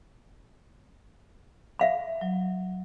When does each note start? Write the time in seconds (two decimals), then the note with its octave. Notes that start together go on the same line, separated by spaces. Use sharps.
1.79 E5 F5 B5
2.21 F#3